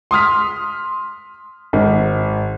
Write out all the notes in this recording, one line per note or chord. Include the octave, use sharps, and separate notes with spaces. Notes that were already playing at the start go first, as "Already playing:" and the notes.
C6 D#6 F6 B6
G#1